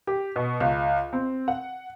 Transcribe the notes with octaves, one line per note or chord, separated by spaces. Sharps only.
G4
B2
C#2
C4
F#5